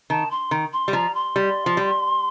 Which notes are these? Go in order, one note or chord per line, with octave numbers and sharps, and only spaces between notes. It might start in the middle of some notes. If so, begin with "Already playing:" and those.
D#3 A5
C6
D#3
C6
G3
F3 A#5
C6
G3
F3
G3